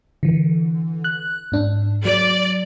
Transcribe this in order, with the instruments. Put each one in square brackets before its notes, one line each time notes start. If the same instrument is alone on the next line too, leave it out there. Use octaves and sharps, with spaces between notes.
[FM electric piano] D3 E3
F#6
G#2 D4
[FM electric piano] F#3 [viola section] D5